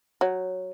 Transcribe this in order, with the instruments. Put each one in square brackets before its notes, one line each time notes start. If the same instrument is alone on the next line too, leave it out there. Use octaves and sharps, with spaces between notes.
[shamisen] F#3 [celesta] C#5